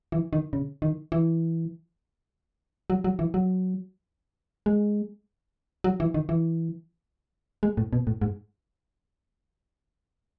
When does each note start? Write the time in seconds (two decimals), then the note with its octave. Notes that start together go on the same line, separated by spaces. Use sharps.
0.12 E3
0.33 D#3
0.53 C#3
0.82 D#3
1.12 E3
2.90 F#3
3.04 F#3
3.19 E3
3.34 F#3
4.66 G#3
5.84 F#3
6.00 E3
6.14 D#3
6.29 E3
7.63 G#3
7.77 A2
7.93 B2
8.07 A2
8.21 G#2